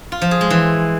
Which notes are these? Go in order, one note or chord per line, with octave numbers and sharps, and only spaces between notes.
F4
F3
G#4
G#3
E3